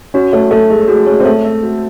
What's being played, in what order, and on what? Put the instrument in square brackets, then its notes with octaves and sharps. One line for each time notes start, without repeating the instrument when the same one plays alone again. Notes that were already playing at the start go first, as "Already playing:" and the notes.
[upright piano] C#4 [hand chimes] F#4
[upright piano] A3 [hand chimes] C#5
[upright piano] A3 [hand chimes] A4
[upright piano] G#3 [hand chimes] E5
[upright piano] G#3 [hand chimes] F#4
[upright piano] G#3 [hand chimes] C#5
[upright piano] C4
[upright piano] A3 [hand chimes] A4
[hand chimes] E5
F#4